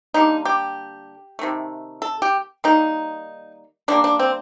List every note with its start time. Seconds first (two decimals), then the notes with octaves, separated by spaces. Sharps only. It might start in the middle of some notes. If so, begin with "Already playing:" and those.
0.14 D3 G3 A#3 D#4
0.45 G4
1.39 C3 D#3 A3
2.02 A4
2.22 G4
2.64 D#3 G3 A#3 D#4
3.88 D3 G3 A#3 D4
4.04 D4
4.19 C4